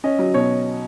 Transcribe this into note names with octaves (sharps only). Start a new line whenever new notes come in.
C#4 D#5
F#3
B2 C#5